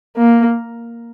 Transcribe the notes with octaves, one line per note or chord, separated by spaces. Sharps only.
A#3